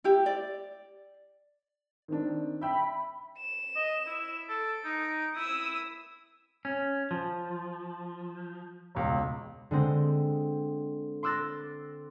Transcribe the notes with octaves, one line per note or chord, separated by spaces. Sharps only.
E4 G4
D5
D#3 C4 D4
E5 G5 B5 E6
E7
D#5
E4
A4 D7
D#4
E4 D#6 E6
C#4
F3
E1 C#2
D3 G#3 C4
C6 D6 E6 F#6 A6 A#6